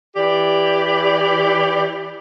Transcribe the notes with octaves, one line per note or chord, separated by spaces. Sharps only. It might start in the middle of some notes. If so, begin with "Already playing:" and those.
E3 G4 D5